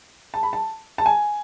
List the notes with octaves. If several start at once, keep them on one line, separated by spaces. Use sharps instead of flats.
A5
B5
A5
A5
G#5